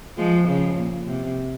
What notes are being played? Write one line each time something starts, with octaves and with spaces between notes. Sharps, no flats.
F3 G#3
C#3 F3
A#2
C3